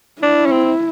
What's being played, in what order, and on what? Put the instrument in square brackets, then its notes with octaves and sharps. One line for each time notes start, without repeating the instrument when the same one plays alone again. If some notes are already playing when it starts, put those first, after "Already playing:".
[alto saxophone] D4 [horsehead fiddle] E4
[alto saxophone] C#4
C4